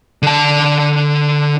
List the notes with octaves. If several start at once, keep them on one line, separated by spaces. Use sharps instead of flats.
D3 A5